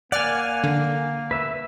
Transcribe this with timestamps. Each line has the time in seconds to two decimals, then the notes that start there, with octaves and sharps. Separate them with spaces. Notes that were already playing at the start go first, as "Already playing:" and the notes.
0.12 A#3 D5 F#5 G#5 F6
0.64 D3
1.31 B4 E5